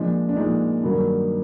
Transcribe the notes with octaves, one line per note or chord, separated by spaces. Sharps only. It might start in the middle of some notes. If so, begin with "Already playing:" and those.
Already playing: A#2 F3 G#3 D4
D4
A#2 F3 G#3 D#4
G2 D#3 F#3 A#3